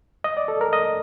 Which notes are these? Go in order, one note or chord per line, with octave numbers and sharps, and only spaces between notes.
D#5
D5
A4
A#4
D#5